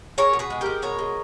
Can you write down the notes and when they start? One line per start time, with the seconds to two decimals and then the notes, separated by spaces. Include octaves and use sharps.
0.18 G#3 A#4 C#5
0.33 B2
0.39 G#4 B4
0.50 G#3
0.61 G#3 G4 A#4
0.82 B2 A#4 C#5
0.99 G#3